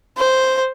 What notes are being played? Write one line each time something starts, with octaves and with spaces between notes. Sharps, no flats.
C5